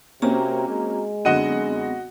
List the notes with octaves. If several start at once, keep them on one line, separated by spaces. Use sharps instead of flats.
C3 A#3 C4 C#4 F#4 A#5
G#3
F#2 D3 B3 C4 F#4 D#5 F#5